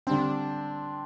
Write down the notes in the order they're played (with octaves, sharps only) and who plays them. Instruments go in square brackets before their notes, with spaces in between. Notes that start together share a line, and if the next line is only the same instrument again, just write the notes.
[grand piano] D3 G3 C4 [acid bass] D4